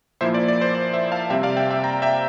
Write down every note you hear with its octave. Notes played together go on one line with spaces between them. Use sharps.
A#2 F3 A#3 E4 C5 E5
D5
D5
C5
D5
C5 E5
F5 A5
C3 G3 C4 E5 G5
D5 F5
E5 G5
E5 G5
G5 A#5
E5 G5